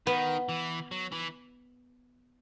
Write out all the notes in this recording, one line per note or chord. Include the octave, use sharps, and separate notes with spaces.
D#3 B3
E3
F#3
E3